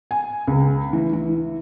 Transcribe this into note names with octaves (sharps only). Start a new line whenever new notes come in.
G#5
C#2
E3
E3